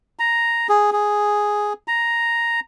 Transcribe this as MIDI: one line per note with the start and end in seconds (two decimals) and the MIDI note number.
0.19 0.67 82
0.69 0.90 68
0.93 1.73 68
1.88 2.60 82